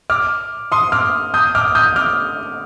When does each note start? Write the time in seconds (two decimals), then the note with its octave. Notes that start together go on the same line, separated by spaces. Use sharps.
0.10 D6 F6
0.72 C6 D#6
0.92 D6 F6
1.34 D#6 G6
1.55 D6 F6
1.75 D#6 G6
1.96 D6 F6